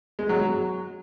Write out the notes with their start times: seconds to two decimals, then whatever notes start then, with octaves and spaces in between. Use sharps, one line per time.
0.19 G#3
0.29 F#3